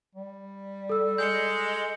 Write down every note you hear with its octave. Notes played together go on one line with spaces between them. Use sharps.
G3
A4 E6
G#3 G6 C#7